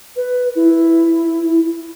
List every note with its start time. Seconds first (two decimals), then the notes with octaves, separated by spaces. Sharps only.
0.16 B4
0.55 E4